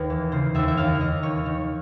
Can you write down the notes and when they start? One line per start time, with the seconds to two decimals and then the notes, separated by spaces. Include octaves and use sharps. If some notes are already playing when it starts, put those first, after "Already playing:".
Already playing: D#2 B4
0.10 E3
0.32 C#3 C5
0.55 D#2 E5
0.68 E5
0.77 D#2 F5
1.00 D#2 D#5
1.23 D#3 C#5
1.46 D#3